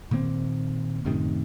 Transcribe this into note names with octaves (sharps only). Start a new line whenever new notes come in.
A#2 D#3 A#3 C4
F#2 A2 C3 D#3